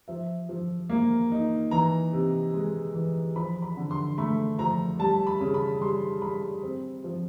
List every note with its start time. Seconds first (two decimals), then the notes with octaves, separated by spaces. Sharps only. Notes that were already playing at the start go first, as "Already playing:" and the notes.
0.08 F3 E5
0.49 F3
0.90 A#3
1.32 D#4
1.71 E3 A#5
2.13 C3
2.54 G#3
2.95 E3
3.36 F3 B5
3.62 B5
3.77 D3
3.91 C6
4.18 A3 B5
4.59 F3 A#5
4.99 G3 A5
5.27 B5
5.41 C#3
5.54 B5
5.81 G3 C6
6.22 G3 B5
6.63 C4
7.04 F3